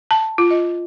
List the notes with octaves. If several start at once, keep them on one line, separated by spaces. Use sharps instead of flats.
A5
F4
D#5